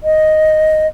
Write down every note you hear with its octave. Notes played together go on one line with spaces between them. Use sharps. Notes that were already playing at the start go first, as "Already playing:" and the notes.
D#5